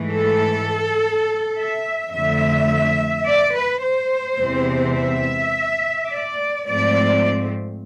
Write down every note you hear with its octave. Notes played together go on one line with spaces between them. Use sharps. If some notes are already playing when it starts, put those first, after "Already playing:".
Already playing: G#2 E3 A3
A4
E5
F2 D3 A3 E5
D5
B4
C5
E2 C3 E3 G#3 C4
E5
D5
G#2 F3 A3 C4 D5